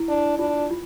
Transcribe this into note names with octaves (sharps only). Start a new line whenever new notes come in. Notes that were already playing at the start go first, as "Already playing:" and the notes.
Already playing: E4
D4
D4 F4
F4